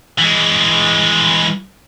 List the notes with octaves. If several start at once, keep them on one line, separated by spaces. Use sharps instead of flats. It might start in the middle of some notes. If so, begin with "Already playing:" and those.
E3 G#3